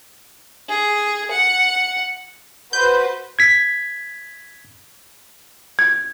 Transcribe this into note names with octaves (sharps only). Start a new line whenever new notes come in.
G#4
F#5
F#4 B4 C5 G6
G#6 B6
G#6